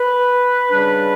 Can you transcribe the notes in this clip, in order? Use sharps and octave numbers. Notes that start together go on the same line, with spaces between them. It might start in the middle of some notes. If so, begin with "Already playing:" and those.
Already playing: B4
C#3 G3 D4 B4